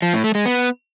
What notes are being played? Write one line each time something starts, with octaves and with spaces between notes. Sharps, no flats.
F3
A2
A3
G#3
B3